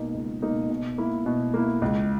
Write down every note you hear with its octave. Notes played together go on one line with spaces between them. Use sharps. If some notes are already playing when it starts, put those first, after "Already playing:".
Already playing: B2 A#3 D#4
C#2
B2 A#3 D#4
B2
A#3 E4
B2
A#3 E4
C#2